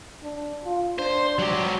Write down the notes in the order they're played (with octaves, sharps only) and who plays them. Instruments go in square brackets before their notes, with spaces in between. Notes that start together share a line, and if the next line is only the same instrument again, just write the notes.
[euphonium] D4
F4
[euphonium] D4 [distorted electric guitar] C5
[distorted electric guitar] F#3 G4